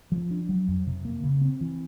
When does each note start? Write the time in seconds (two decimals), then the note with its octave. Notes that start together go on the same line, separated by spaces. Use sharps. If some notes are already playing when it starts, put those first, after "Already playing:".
0.12 F3
0.31 D4
0.49 F#3
0.68 F2
0.87 C3
1.05 A#3
1.24 C#3
1.42 C4
1.61 E3